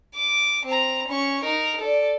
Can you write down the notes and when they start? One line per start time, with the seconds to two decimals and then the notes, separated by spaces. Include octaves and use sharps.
0.16 D6
0.65 C4 A#5
1.08 C#4 C#6
1.44 D#4 A#4
1.81 A4 D5